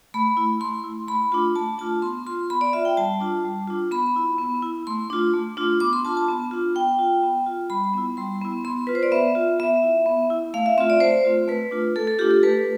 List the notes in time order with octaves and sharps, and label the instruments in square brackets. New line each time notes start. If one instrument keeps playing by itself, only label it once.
[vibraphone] A3 B5
E4
A3 C6
E4
A3 B5
D4 F4
A3 A5
D4 F4 A5
B3 C6
F4 C6
B3 B5
D5
F4 E5
G5
G3 A5
D4 F4
G3
D4 F4
B3 B5
E4
B3
E4
A3 C6
D4 F4
A3
D4 F4
B3 D6
C6
D4 F4 A5
A5
B3
D4 F4
B3 G5
F4
B3
F4
G3 B5
B3 E4
G3 C6
B3 E4
B3 C6
F4 B4
C5
D5
B3 E5
F4
B3 E5
E4
B3
E4
A3 F5
E5
C4 F4 E5
D5
A3 C5
C4 F4
A3 B4
D4 F4
A3 A4
A4
D4 F4 G4
A4
A3 B4